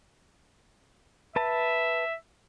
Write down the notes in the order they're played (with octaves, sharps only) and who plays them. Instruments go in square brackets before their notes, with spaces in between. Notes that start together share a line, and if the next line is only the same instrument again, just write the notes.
[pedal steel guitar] B4 A5 [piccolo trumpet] E5